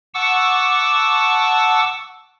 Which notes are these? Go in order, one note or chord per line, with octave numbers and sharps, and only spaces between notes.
F#5 A5 C#6 D6 E6